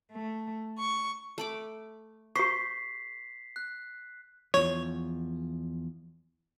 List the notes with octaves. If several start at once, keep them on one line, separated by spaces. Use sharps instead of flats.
A3
C#6
A3 B5 D6
G4 C5 C#6 B6 C7
F#6
E2 F3 C#5